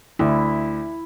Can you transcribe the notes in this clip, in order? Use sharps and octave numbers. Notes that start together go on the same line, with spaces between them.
D2 E4